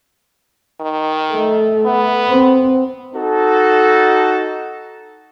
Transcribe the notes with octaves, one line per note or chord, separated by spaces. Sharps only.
D#3
A3
B3
C4
D#4 F#4 A4